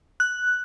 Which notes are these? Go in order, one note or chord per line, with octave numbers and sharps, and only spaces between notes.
F#6